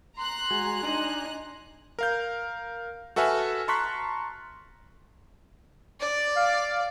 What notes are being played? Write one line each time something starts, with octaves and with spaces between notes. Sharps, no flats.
A#5 C6 F#6
G#3 F#4 G#5
D4 D#4 G#5 C6
A#4 F5 G6
F#4 A4 B4 E5 G#5 F6
A5 A#5 C6 C#6 F#6 B6
D5
F5